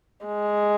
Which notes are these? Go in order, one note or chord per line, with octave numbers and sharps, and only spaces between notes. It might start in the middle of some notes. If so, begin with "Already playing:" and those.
G#3